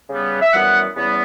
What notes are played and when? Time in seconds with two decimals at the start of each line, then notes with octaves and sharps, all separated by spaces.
0.09 C#3 G3 B3
0.41 E5
0.53 F#2 E3 G3 B3 F#5
0.96 E2 C#3 G3 B3